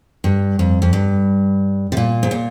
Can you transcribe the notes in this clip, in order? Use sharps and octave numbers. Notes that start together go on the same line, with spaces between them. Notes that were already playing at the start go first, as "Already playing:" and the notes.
G2
F2
F2
G2
C3
A#2
G#2
A#2